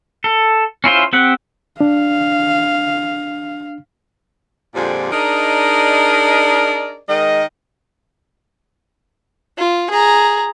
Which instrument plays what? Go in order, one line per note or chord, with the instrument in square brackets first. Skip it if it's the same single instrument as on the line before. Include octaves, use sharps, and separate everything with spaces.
[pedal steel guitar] A4
C#4 E4 F4 C5
C4 G4 F#5
[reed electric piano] D4 [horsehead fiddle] F5
[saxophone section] F2 A#2 D3 G3 G#4 C5
D4 D#4 G#4 A#4 D5 D#5
D#3 G#3 A#4 D#5
[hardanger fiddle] F4
G#4 A#5